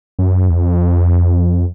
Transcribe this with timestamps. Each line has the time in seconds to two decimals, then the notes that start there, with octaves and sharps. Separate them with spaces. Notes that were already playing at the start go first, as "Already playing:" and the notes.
0.19 F#2
0.50 E2
0.55 F2